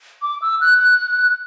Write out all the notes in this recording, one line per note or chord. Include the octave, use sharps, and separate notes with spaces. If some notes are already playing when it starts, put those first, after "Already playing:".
D6
E6
F#6
F#6